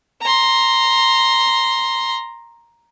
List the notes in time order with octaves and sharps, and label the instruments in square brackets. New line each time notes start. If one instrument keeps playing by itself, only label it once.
[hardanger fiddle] A#5 C6